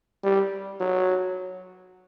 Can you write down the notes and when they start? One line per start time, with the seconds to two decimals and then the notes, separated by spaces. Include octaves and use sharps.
0.24 G3
0.80 F#3